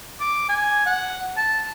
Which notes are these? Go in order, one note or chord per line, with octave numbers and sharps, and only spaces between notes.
D6
G#5
F#5
A5